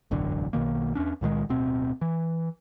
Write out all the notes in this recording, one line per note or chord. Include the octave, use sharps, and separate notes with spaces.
E1 A1 F#2 D3
B1 B2 D#3 A#3
E2 C#4 D4
C#2 A#2 D#3 G#3
D1 B2 C4
E3